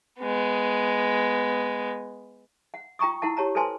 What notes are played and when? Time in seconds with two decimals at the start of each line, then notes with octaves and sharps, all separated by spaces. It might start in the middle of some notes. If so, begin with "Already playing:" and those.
0.20 G#3 B3
2.74 F#5
2.99 F4 G5 A#5 C#6 D#6
3.22 E4 A#4 F#5 A5
3.37 G4 C#5 A5 A#5
3.55 A4 B4 C5 G#5 A5 C6